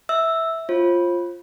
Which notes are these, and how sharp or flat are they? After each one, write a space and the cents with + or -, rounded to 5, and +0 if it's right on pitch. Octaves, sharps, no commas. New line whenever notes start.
E5 -15 E6 +0
F4 +0 C5 +40